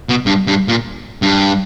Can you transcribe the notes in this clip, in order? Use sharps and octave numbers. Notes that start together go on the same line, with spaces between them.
B2
G2
G2
A#2
G2